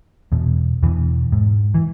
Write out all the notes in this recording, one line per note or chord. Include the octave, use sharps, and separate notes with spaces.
E2 B2
E2 B2 E3
G#2
E3